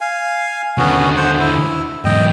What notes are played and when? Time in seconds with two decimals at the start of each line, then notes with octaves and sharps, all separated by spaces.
0.01 F5 G#5
0.78 D#2 D3 B3 C#4 F#4
1.17 C5 F#5
1.40 E4
2.05 E2 G#2 D#5 G5